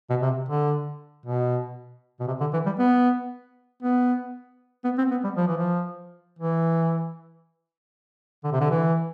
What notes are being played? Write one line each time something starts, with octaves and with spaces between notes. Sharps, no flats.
B2
C3
D3
B2
B2
C3
D3
E3
G3
B3
B3
B3
C4
B3
G3
F3
E3
F3
E3
D3
C3
D3
E3